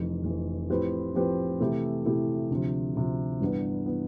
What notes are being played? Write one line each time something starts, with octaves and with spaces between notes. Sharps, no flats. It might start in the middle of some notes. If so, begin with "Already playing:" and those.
Already playing: F1 F2 E3
F1 F2 E3
A2 F3 C4 G4 B4
A2 F3 C4 G4 B4
C3 E3 A3 E4 G4
C3 E3 A3 E4 G4
D2 C3 F3
D2 C3 F3
G1 G2 E3 B3
E3 B3